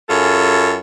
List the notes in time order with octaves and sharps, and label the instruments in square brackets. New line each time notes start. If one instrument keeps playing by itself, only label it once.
[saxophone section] F#2 F4 G#4 A4